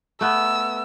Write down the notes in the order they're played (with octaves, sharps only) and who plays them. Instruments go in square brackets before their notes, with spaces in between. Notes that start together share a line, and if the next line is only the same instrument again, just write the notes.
[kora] A3 B3 [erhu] E6